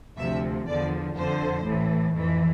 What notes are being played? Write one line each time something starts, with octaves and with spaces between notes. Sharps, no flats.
D2 C3 F3 E5
E2 D3 F3 D5
F2 D3 F3 C5
A1 A2 E3
F2 E3